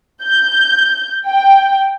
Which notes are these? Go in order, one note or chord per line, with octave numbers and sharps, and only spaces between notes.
G6
G5